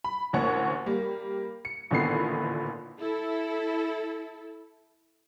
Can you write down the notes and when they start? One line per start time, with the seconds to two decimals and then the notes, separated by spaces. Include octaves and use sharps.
0.04 B5
0.33 A1 D2 A#3 C#5 F#5 C#6
0.86 G3 A#3
1.65 C#7
1.91 A1 A#2 D3 D#3 B3 C7
3.00 E4 A4